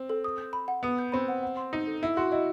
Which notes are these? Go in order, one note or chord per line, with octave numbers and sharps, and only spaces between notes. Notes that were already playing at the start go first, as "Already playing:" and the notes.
Already playing: C4
A4
D#6
G6
B5
F#5
B3 D#6
G6
C4 B5
F#5
F#5
C6
D#4 D#5
A4
E4 F#5
F#4 C6
E4 D#5